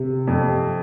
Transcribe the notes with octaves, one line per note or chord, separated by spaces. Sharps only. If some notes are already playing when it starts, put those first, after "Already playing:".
Already playing: C3
F2